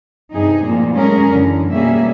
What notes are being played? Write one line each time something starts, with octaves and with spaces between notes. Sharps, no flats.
G2 C3 D#4 G#4
A#2 F3 A#3
F#3 G#3 A3 C#4 G#4 A#4
F#2 D3 E3
B2 G3 A#3 C#4 G#4 E5